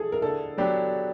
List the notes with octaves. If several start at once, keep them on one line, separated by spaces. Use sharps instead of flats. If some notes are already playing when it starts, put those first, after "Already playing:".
Already playing: G#4 A4
A#4
D3 A4
F#3 B3 D4 G4